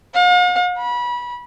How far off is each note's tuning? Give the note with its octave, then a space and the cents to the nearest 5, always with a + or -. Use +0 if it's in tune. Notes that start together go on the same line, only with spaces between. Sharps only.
F5 +45
B5 -25